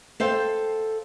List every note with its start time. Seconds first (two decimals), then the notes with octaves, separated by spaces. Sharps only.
0.20 A4 C5 F5 G5